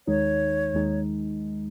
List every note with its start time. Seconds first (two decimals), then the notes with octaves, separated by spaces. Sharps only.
0.07 D#2 D#3 G#3 D#4 C#5
0.74 D#2 D#3 G#3 D#4